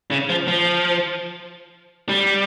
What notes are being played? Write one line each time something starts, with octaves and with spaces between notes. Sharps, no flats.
C#3
F3
F3
G3